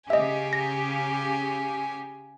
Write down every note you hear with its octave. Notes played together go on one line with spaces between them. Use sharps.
C#3 G4 D#5 E5 G#5
A#6